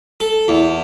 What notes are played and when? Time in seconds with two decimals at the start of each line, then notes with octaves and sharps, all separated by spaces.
0.20 A4
0.48 E2